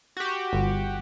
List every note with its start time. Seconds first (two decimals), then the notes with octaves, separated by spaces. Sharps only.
0.17 F#4 G4
0.53 G1